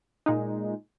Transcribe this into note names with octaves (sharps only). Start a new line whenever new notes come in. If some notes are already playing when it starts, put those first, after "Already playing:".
A#2 G#3 D#4